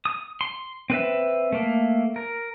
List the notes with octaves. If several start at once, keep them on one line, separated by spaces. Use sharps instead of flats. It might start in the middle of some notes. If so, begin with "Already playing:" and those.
D#6
C6
C4 B4 E5
A3 A#3
A#4